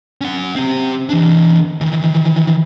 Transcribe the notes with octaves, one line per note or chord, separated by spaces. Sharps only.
C#4 F#5
C4 G4
E3 D4
D#3 E3